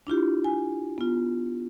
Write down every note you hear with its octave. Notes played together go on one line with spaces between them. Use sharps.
D4 E4 F4 G4
G#5
B3 F4